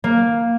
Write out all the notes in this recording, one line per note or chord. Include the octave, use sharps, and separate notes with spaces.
A#3